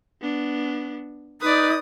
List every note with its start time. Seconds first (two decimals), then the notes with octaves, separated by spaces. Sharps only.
0.21 B3 D4
1.41 D#4 B4 D5 D#6